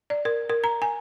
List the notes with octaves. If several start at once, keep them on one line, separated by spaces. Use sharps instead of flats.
D5
A#4
A#4
A#5
G#5